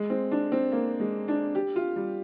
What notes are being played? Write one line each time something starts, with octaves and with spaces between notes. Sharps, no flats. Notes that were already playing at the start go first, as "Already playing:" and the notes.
Already playing: G#3
C4
D4
C4
A#3
G#3
D4
G4
F4
G3